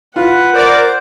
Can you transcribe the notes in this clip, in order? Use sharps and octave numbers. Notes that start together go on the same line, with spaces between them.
F4 B4 F#5
A#4 C5 D5 D6